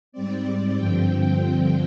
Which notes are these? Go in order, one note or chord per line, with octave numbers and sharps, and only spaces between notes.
G#2 G3 C4 D5
G2 D3 F3 C4 G5